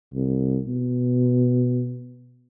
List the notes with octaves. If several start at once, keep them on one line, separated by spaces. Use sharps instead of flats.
C2
B2